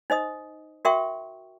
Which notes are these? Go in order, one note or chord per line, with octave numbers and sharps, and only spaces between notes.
D#4 C5 D#5 D#6
F#4 A#4 E5 G5 C#6